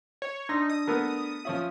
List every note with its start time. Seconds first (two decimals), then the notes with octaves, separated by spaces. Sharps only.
0.22 C#5
0.49 D4 D#4 D5 C6 A#6
0.70 D#6
0.87 A3 B3 A#4
1.45 F3 C#4 F4 E5 C#6